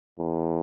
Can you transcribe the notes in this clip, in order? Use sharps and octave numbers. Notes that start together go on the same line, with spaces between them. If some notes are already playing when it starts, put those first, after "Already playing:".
E2